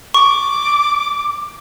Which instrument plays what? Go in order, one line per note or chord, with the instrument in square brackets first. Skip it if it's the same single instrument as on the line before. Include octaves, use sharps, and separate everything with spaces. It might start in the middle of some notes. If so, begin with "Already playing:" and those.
[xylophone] C#6 [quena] D6